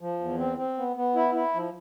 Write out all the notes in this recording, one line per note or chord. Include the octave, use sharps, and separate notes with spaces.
F3
E2
C4
C4
B3
B3
E4
E4
F3